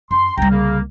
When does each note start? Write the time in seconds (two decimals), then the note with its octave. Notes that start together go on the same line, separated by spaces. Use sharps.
0.11 F#2 C6
0.38 C2 G3 G5 A#5
0.50 C#3 A#3